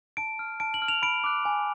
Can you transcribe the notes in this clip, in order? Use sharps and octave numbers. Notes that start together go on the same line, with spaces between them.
A5 D7
F6
A5 D7
F#7
F6
F7
B5 D7
D6 F#6
G#5